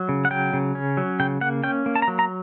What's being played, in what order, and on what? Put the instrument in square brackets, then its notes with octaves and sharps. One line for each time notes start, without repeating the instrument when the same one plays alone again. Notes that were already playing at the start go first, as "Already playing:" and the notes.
Already playing: [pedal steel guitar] F#3
C#3
F#5
F#3 G5
C#3
C#4
F#3
C#3 G5
A#3 F#5
C#4 G5
A#3
A5
A#5
F#3
A#5